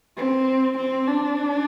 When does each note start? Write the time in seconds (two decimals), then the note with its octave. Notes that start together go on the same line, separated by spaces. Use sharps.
0.17 C4
0.78 C4
1.08 D4